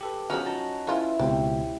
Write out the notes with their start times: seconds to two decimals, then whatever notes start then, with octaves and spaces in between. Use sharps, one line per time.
0.01 G4 A4 B4
0.30 F3 F#3 C#4 F#4 F#5 B5 F6
0.46 D#4 A5 A#5
0.87 C#4 E4 F4 B4
1.19 C#2 B2 C4 G4